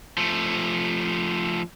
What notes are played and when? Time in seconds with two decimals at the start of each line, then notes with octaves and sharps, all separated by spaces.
0.18 F3 A3